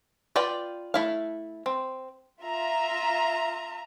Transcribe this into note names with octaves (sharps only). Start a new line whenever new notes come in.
F4 B4 D5 G5
A3 E4 F5
C4
F4 E5 A#5